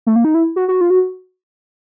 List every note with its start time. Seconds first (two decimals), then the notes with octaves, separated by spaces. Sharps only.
0.07 A3
0.16 A#3
0.25 D#4
0.34 E4
0.56 F#4
0.68 F#4
0.81 F4
0.90 F#4